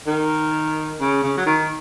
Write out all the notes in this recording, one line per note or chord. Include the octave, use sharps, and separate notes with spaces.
D#3
C#3
C#3
F#3
D#3